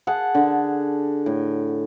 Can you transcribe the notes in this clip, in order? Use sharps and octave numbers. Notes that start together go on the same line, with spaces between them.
G#4 F#5 A5
D3
A2